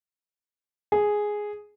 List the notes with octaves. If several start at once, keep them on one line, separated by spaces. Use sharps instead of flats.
G#4